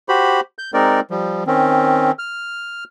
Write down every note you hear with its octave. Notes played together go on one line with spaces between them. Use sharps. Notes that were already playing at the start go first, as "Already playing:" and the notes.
F#4 G4 C5 B5
G6
G#3 C4 D#4 A#4 D5
F3 G3
D#3 C4 C#4
F6